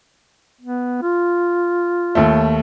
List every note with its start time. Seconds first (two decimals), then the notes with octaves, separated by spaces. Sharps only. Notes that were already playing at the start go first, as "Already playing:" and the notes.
0.61 B3
1.02 F4
2.15 D#2 A3